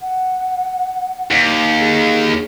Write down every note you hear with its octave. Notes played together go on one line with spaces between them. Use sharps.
F#5
D#2
G#4